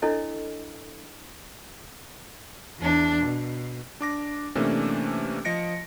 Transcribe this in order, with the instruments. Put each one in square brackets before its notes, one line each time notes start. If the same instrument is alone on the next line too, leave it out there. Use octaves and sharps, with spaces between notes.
[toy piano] D4 E4 A4 C#5 D#5
[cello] E2 D4
B2
[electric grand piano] D4 D6 A#6
C3 E3 A3 A#3 C#4 D4
F3 D#5 A#6 C#7 D7